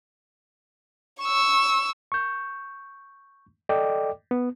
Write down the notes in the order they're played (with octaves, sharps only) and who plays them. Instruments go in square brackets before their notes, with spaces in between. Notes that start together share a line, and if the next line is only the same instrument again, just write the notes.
[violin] C#6 E6
[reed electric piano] C#6 G6
A4 D5 D#5 G5 D6
B3